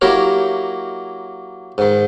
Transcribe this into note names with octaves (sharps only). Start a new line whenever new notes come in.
F#3 A#3 E4 G4 A#4 C#5
G#2 D#3